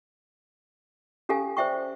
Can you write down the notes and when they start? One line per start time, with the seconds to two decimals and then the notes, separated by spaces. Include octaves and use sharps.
1.29 C#4 G4 A4 F5 G#5
1.57 C5 D5 E5 G5 C#6